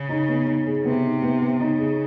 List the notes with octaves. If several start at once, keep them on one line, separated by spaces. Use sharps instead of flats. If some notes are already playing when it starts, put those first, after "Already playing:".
Already playing: C#3
D#4
B3
D#4
G#4
C3 B3
D#4
B3
B3
C#3 D#4
G#4